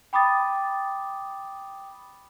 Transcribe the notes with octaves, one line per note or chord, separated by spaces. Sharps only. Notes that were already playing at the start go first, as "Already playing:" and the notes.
G5 B5 D6 D#6 A6